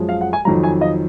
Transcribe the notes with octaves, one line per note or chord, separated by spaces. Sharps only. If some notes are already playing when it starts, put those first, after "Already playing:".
Already playing: F#2 F3 G#3
F5
F#5
G#5
F2 D#3 F#3 A#5
G#5
D#5